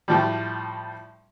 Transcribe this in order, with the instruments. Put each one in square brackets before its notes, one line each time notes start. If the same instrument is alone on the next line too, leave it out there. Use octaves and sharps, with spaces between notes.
[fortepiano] A2 F3 G3